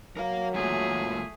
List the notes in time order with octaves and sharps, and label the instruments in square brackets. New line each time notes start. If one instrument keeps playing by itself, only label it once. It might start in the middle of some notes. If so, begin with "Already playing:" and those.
[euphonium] F#3 [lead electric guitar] A#4 F5
[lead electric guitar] F#2 A#2 [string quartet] A3 G#4